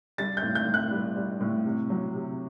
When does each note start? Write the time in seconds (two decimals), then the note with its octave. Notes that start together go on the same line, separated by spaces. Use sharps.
0.18 G3 A6
0.37 G6
0.43 A2
0.55 G6
0.67 A2
0.74 F#6
0.91 G3
1.16 G3
1.41 A2
1.65 C3
1.90 F#3
2.14 C3